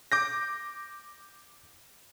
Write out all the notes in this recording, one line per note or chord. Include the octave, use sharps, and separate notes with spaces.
D6 G6 A#6